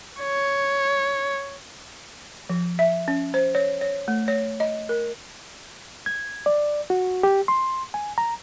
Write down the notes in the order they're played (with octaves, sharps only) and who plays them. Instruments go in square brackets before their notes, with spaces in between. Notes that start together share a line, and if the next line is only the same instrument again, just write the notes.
[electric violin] C#5
[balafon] F3
E5
C#4
C5
C#5
C#5
A3
C#5
D#5
A#4
[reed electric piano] G#6
D5
F#4
G4
C6
G#5
A#5